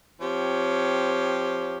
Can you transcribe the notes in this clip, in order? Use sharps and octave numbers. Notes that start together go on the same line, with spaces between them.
F3 C4 G4 C#5